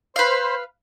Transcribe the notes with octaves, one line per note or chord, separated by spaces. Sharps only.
B4 C5 F5